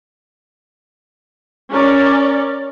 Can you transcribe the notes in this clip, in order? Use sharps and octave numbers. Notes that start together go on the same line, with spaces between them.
C#4 A#4 C#5 D5